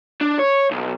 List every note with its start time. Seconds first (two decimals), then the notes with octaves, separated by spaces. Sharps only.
0.21 D4
0.39 C#5
0.71 B1